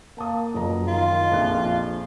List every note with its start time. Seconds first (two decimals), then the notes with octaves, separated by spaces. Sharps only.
0.18 A#3 A5 D#6
0.54 F#1 B2 F3 A#5
0.87 D#3 F4
1.32 A#1 F2 D4 F#6